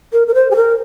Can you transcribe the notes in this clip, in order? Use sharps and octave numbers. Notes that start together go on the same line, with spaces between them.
A#4
A#4
C5
G#4
A#4